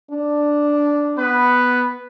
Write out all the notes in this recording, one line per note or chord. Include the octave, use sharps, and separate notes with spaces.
D4
B3 B4